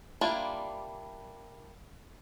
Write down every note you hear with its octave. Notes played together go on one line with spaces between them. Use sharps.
G3 A#3 D4 E4 F4